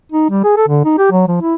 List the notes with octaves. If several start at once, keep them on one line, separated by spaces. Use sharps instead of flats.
D#4
G3
G#4
A4
D3
D#4
G4
F#3
F3
E4